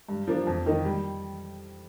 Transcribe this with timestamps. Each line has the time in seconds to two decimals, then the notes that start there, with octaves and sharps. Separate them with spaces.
0.09 G2
0.27 F3 A#3 D4
0.47 F2
0.66 D#3 A#3 D#4
0.85 G3